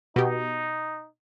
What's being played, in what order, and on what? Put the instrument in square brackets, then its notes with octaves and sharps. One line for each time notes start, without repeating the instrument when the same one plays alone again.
[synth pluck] B2 G4 [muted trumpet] D#4